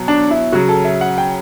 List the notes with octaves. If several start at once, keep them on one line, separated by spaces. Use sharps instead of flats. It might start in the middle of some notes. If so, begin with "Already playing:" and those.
Already playing: B2 F#3
D4
E4
C#3 F#3 F#4
A4
E5
F#5
G5